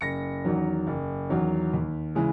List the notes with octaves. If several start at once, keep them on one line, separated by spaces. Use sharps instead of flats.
F#1 A#6 C#7
E2 D#3 F#3
F#1
E2 D#3 F#3
D#2
C#3 E3 G#3